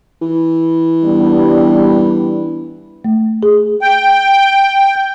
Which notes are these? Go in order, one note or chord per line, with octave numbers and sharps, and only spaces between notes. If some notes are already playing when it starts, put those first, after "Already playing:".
E3
G3 B3 D4
A3
G#4
G5